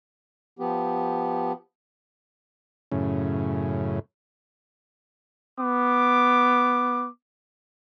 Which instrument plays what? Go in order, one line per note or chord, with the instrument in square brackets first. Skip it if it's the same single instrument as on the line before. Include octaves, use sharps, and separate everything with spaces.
[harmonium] F3 B3 G4
[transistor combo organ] F#2 A2 C#3
[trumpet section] B3 D6